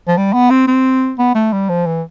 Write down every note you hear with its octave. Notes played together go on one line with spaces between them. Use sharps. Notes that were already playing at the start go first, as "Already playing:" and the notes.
F3
G3
B3
C4
C4
B3
A3
G3
F3
E3